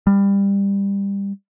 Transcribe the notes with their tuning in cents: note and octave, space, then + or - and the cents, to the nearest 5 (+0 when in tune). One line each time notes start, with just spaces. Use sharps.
G3 +20